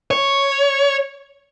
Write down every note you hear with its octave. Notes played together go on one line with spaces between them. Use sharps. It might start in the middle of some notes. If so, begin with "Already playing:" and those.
C#5